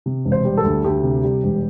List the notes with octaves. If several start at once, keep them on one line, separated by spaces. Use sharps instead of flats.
C3
E1
C5
G3
A4
D2
D2 G4
C3
G3
E1